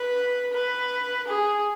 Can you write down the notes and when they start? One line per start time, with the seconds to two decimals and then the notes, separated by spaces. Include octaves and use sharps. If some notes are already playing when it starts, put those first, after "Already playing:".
Already playing: B4
0.53 B4
1.27 G#4